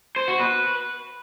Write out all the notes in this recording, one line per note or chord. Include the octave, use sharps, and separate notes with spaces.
C5
F#4
B4